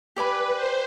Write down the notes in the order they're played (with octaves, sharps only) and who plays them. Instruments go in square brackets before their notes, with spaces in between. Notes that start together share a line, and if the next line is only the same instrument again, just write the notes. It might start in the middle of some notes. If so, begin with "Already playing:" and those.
[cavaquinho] G4 D5 G#5 B5 [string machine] B4
[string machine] C5